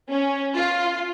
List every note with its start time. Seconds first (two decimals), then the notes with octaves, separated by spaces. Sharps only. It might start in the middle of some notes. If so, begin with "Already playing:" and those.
0.10 C#4
0.54 F4